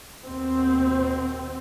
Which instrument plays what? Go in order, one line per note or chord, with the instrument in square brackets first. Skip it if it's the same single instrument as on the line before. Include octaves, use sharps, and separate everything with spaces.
[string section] D#2 B2 C4